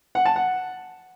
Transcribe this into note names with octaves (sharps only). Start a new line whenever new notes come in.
F#5
A5
F#5